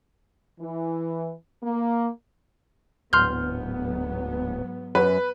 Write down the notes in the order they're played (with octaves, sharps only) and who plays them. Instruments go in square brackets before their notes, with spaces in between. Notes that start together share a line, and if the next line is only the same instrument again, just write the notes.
[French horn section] E3
A#3
[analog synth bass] D1 [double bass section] G#2 F#3 B3 [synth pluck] C6 F6 G6
[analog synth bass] F#2 [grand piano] B4